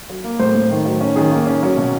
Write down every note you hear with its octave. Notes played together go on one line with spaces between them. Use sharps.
F#3
A#3
A2 C5
A2
D#3
F#3
C#4
D#3 G#4
A#3
C#4
F#3
B2